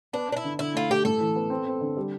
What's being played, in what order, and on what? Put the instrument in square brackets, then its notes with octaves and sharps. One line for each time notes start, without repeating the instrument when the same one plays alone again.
[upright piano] B3 [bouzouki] D4
[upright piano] B3 [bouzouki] D4
[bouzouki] E4
[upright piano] D3
[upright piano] D3 [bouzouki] E4
[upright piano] A3 [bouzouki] F4
[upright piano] A3 [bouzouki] G4
[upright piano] A2 [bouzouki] A4
[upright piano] E3
B3
C4
C4
D3
G3